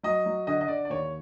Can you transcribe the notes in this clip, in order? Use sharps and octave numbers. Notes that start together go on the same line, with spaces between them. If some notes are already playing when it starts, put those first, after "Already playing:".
F#3 D#5
F#3
D3 D#5
D#5
D3 D5
D5
D#2 C#5